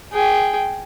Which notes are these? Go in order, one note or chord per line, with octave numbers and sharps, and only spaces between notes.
G#4 G5